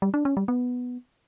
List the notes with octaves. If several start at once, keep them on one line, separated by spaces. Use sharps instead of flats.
G3
D4
C#4
G3
B3